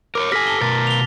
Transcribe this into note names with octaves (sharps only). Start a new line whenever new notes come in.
A#4 C5 C#5 D6
G4 A4 G#5 F6 A#6 B6
A5 G7
B2 A#4 A6
F7 G7